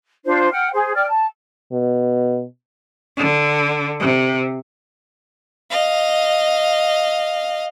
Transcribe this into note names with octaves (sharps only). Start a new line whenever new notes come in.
D4 F4 C5
F#5 G5 F6
G#4 C5
D5 G5 F6
A5
B2
D3
C3
D#5 F5